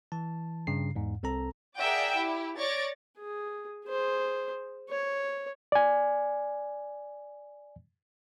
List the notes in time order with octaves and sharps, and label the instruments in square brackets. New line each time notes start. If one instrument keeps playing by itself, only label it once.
[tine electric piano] E3 A5
G2 C#3 C7
E2 G#2
C2 C4 A4 A#5
[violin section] G#4 A#4 D5 E5 F#5 G5
E4 G4
C#5 D5 C#6 A6 A#6 D7
[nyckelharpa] G#4
G#4 C5
C#5
[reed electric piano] D5 G#5